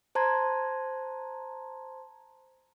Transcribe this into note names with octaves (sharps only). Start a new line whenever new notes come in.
C5 A5 A#5 C6 G#6